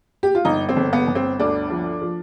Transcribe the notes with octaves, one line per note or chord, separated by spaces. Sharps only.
G4
F4
G1 D#4
C4
G1
B3
G1
C4
D2 D4
F3
F3